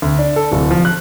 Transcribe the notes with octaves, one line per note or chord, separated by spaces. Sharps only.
D2
D4
A4
D1
F3
F#6